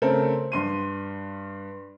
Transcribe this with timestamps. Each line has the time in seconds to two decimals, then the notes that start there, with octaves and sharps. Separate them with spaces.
0.02 C#3 A3 C4 A4 A#4
0.52 G2 C6 D#7